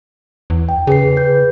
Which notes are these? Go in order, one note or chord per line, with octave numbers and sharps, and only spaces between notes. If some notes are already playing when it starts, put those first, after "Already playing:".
E2
G5
C#3 G#4 B4 C7
B4 G6